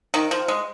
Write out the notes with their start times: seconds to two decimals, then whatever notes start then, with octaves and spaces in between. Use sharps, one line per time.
0.14 D#3
0.31 F3
0.48 G#3